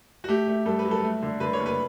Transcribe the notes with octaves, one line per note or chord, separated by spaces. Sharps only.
F#4
A3 G4
A3
G2 A4
B4
F#3
A4
A3
D3
D3 B4
C#5
F#1
B4